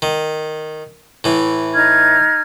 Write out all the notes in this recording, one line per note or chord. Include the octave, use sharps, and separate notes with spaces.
D#3
A2 E3
D#4 F6 G#6